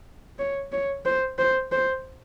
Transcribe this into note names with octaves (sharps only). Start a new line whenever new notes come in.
C#5
C#5
C5
C5
C5